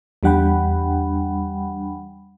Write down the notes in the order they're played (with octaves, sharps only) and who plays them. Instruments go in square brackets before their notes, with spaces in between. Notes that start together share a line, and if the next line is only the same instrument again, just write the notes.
[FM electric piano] E2 G3 D4 F#5 G5 B5